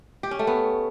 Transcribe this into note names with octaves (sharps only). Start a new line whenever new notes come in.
G4
C#4
A3
B3